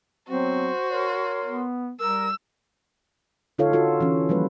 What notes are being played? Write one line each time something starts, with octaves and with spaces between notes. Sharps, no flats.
F#3 B3 C4 F#4 C5
A#4 C#5 C6
B3
G3 A#4 E6
D3 D#4 F4 A4 C#5 F5
F4 F#4 A4
E3 C#4
F3 G3 A#3 B4